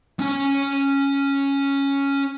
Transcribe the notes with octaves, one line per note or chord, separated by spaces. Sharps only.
C#4 G#5